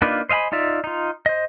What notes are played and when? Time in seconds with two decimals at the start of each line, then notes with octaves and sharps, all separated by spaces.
0.02 A#3 D4 D#4 F4 B4
0.29 C5 D#5 F5 G#5 B5
0.52 D#4 F4 D5 E5
0.84 D#4 F4
1.26 C5 D#5